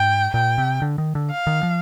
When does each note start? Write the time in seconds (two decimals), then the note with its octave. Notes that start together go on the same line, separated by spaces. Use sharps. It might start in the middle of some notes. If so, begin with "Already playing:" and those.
Already playing: G#2 G5
0.34 A#2 G5
0.58 C3
0.82 D3
0.98 D#3
1.15 D3
1.31 F5
1.47 D#3
1.63 F3